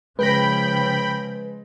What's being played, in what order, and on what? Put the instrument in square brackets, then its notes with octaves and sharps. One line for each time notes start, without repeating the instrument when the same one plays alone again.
[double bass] C#3 F3 [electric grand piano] G#3 A#6 [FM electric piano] B4 [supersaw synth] G5 B5